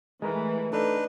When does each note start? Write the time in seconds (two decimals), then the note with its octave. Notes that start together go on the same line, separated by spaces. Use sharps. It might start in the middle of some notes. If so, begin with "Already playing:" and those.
0.22 E3 G#3 A3 A#4 B4
0.73 D4 D#4 A4 B4